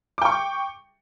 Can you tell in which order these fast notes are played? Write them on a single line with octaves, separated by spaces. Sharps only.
D6 G5 C#6